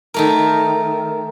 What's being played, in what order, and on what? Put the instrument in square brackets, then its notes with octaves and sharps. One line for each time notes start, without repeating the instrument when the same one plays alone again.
[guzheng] D#3 A3 A#4